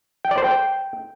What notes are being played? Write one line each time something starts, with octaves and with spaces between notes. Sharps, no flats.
G5
D5
C5
G5